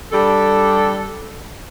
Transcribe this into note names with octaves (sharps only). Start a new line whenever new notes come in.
G3 D4 A4